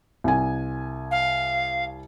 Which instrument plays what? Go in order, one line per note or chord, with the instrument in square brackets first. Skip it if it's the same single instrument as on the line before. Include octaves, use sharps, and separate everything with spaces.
[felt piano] C2 G#5
[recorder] F5